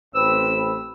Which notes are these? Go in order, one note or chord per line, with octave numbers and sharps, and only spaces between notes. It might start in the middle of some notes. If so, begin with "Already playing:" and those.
A1 C4 B4 E6